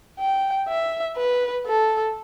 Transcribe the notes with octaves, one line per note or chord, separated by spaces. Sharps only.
G5
E5
B4
A4